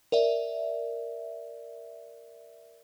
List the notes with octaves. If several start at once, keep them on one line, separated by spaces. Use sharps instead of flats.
A#4 D5 E5